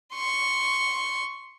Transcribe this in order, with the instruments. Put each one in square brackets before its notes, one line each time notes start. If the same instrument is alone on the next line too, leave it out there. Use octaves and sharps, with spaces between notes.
[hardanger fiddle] C6 C#6